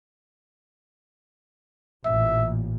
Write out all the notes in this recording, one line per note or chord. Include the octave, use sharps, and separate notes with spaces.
A1 A#2 E5